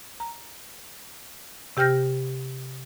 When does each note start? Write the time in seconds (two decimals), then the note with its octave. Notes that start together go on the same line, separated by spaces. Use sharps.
0.20 A#5
1.77 C3 G4 G5 F6 G6 A#6